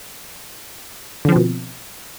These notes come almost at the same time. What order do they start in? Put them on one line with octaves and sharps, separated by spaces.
D3 F3 C4 B2